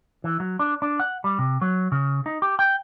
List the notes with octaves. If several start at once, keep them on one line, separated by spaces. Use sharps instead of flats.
E3
F#3
D4
D4
F#5
G3
C3
F#3
C#3
D#4
G4
G5